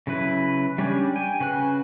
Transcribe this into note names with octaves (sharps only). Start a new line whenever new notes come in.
C#3 F#3 E4 B4
G3 C#4 D4 G4 G#5
G5 G#5
C#3 F#4 B4 G#5 F#6